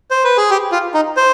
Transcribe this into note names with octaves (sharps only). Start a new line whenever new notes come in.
C5
B4
G#4
G4
F4
D#4
C5